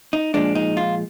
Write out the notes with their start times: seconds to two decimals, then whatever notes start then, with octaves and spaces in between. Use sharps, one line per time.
0.13 D#4
0.34 A#2 F3 G#3 D4
0.55 D#4
0.77 F4